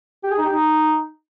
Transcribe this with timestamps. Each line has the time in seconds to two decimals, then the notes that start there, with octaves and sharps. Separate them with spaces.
0.23 G4
0.31 G#4
0.38 D#4
0.45 G4
0.52 D#4